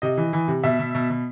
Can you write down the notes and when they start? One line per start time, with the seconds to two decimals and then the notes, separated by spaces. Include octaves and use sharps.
0.02 C3 D#5
0.17 E3
0.33 E3
0.48 C3
0.63 B2 E5
0.79 B2
0.95 B2
1.10 B2